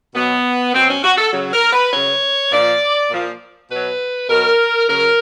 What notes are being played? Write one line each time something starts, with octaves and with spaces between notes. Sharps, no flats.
B2 F#3 B3
B2 F#3 C4
C#4
F#4
A4
C#3 F#3
A#4
B4
C#3 F#3 C#5
A#2 F3 D5
A#2 F3
B2 F#3 B4
B2 F#3 A#4
C#3 F#3 A#4